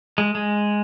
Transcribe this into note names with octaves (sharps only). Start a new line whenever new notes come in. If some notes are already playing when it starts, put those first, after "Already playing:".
G#3
G#3